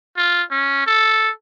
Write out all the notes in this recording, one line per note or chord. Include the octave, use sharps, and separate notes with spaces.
F4
C#4
A4